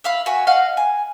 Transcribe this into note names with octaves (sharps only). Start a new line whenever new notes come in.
E5 F5 B5
F#4 E5 G#5
D#5 F5 F#5
G#5